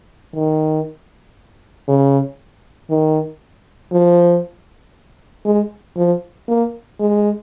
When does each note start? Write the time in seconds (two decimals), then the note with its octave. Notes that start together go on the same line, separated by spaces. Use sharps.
0.34 D#3
1.88 C#3
2.90 D#3
3.92 F3
5.45 G#3
5.97 F3
6.48 A#3
6.99 G#3